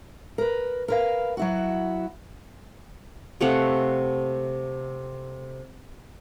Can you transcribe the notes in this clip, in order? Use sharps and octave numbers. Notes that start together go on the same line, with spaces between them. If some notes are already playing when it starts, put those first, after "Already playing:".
A#4 B4
A#4 B4 F5
F#3 E4 F#4
C3 A3 F5 F#5